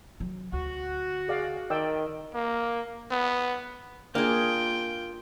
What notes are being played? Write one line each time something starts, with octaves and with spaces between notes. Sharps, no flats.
D#3 F#3
D2 F#4
G#4 D5 F5
D#3 D5 G5 E6
A#3
B3
A#3 D4 F4 G#4 G5